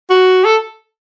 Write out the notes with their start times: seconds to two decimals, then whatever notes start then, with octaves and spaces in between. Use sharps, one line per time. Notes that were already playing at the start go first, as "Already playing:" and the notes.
0.10 F#4
0.45 A4